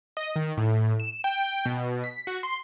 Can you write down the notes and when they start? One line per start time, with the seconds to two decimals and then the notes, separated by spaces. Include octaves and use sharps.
0.17 D#5
0.36 D#3
0.57 A2
1.00 E7
1.24 G5
1.65 B2
2.04 B6
2.27 F#4
2.43 C6